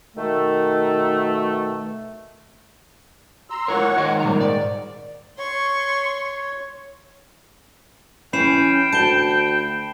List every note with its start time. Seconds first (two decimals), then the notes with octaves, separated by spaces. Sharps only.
0.17 B2 D#3 A3
3.50 A#5 C6 E6
3.68 E4 F4 A#4 C#5 F#5 C#6
3.96 G#2 D#3 F4 D#5 F#5
4.20 A#2 G3 A#5
4.40 D5
5.38 C#5 C6 C#6
8.33 E3 C#4 G5 B5 C7 E7
8.93 D2 A5 D7 G7